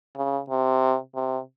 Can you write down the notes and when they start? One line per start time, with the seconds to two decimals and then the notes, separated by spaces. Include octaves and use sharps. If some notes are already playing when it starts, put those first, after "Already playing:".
0.16 C#3
0.50 C3
1.15 C3